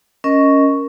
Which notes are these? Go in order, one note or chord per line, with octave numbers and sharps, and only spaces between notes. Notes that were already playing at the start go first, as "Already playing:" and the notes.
C#4 A#4 D#5 C#6